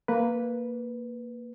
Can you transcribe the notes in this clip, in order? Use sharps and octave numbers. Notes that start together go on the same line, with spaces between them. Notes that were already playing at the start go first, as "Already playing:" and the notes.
A#3 B4